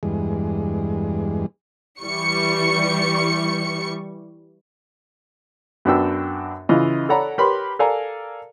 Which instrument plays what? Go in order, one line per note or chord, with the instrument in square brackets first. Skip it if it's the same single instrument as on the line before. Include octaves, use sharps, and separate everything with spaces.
[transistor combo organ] E2 G2 G#3
[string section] E3 G3 C#6 C#7
[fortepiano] F#2 B3 D4 F#4 G5 E6
C#3 E3 F4 D#5
A4 C#5 D5 F#5 A#5 B5
G4 A#4 B4 C#5 B5 C6
A4 A#4 D5 F5 G#5 A#5